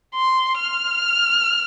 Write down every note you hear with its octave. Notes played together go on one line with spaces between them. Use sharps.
C6
F6